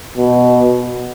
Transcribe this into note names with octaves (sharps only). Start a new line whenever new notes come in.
B2